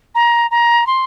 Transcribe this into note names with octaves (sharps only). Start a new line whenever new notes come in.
A#5
A#5
C6